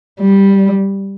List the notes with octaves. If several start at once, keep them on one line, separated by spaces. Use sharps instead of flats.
G3